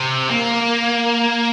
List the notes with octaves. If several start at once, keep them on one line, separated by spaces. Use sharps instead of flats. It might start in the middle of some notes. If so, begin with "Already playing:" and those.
Already playing: C3
A#3